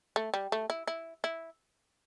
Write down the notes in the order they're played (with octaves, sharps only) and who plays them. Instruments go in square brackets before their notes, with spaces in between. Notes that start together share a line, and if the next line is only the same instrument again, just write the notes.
[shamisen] A3
G3
A3
E4
E4
E4